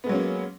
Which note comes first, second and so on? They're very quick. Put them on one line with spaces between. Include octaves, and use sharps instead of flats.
B3 G#3 F#3 C#4 A#3